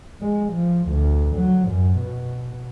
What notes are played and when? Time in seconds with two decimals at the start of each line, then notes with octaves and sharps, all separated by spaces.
0.21 G#3
0.53 F3
0.89 D2
1.36 F#3
1.69 F#2
1.99 B2